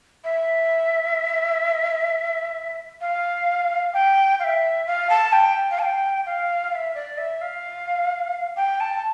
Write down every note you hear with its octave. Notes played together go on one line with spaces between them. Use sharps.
E5
F5
G5
F5
E5
F5
A5
G5
F5
A5
G5
F5
F5
E5
D5
E5
F5
G5
A5